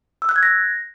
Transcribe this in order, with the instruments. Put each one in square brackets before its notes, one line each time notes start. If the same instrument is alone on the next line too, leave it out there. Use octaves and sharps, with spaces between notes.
[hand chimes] E6
F#6
G#6
A#6